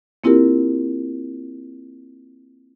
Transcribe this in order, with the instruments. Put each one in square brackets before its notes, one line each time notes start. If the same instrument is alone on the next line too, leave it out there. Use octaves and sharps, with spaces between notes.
[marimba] A#3 C4 E4 F4 G4 A#4